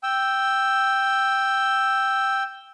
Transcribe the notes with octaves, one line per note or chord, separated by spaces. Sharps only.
G5 E6